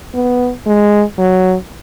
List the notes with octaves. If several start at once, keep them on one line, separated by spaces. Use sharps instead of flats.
B3
G#3
F#3